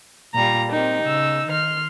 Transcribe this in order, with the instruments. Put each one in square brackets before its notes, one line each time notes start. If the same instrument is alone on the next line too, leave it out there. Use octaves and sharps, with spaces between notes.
[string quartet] A#2 G3 F4 [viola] A#5
[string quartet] C4 G4 A#4 [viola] D#4
[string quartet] C#3 E6
D#3 C6 F6